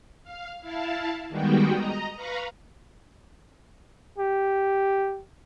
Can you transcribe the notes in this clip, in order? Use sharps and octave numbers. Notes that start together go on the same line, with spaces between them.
F5
E4 F5 A5
D#3 G3 G#3 B3 F#4 G5
D#5 A#5
B4 F5 A#5 B5 C#6
G4